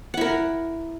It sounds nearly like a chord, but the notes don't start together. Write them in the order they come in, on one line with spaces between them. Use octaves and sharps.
F#5 E4 A#4